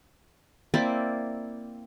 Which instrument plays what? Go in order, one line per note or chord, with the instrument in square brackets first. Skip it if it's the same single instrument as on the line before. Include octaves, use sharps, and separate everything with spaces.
[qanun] A#3 C4 E4 D5